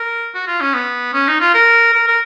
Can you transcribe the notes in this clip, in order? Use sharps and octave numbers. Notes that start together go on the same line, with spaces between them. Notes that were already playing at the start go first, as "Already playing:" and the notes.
Already playing: A#4
F#4
F4
C#4
B3
C#4
D#4
F4
A#4
A#4
A#4